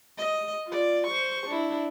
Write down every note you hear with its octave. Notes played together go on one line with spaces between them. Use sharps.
D#5
F4 D5
C5 C#6
D4 E4